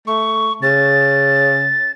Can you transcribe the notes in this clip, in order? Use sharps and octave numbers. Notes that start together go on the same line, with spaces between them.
A3 C#6
C#3 A6